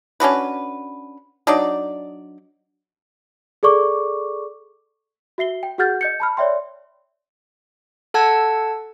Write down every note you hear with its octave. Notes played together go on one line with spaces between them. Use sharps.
C#4 D4 F#4 B4
F#3 D4 D#4 D5
G#4 A4 D5 C#6 D6
F#4 E5 C7 G7
G5
F#4 G#4 F#5 F6 G6 A6
D#5 G6 C#7
A5 B5 F6
C#5 D5 E5 G5 C6
A4 F#5 A5 E6 G#6